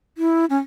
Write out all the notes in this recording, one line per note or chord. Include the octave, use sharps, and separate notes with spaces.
E4
C#4